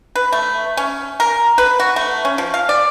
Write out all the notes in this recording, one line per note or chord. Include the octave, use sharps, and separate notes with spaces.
B4
A3
C#4
A#4
B4
F#4
A3
C#4
F3
F5
D5